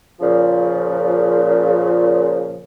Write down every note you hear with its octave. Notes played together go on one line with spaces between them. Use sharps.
A#2 C#3 F3